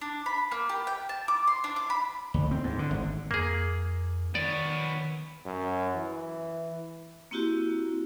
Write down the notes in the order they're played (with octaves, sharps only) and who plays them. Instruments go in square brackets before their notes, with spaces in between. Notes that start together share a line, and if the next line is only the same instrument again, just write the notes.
[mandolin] D4
B5
A#3
G4
G5
A5
D6
C6
D4
D6
B5
[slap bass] D2
C4
G#2
D3
G#1
[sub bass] F2 [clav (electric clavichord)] A#3 G#4
[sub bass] D#3 [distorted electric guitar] B3 C#5 [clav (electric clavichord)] D5
[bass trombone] F#2
E3
[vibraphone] A#3 C4 E4 F#4 G4